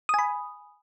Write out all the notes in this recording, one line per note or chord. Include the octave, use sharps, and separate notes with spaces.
G#5 B5 D#6